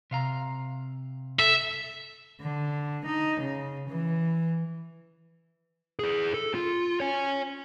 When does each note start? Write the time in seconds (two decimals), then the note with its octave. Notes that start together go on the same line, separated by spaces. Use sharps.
0.11 C3 F5 A#5
1.39 A4 E5
2.41 D3
3.05 D#4
3.41 C#3
3.89 E3
5.99 E4 G#4
6.34 A4
6.55 F4
7.00 C#5 G#5